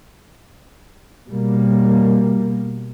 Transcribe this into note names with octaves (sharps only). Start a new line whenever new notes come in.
B2 G3 A#3